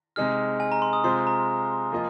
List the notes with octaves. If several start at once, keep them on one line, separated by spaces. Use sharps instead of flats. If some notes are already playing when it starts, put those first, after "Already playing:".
C3 G#3 D#4 G#4 F6
G#5
A#5
C6
D#6
C3 G#3 F4 C5 C6
A#5
F3 A#3 F4 D#5